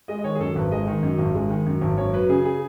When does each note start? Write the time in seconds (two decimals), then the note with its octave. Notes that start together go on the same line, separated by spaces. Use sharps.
0.08 G#3 D#5
0.18 D#5
0.24 D#3 C#5
0.35 G#4
0.40 F#2 A4
0.55 G#1 B4
0.71 G#3 D#5
0.88 D#3
1.03 F#2
1.18 G#1
1.35 G#3
1.51 D#3
1.66 F#2
1.81 G#1
1.97 F#2 C#5
2.13 F#3 B4
2.29 C#3 G#4
2.45 G#4